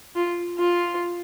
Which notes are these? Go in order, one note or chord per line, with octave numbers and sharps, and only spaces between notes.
F4
F4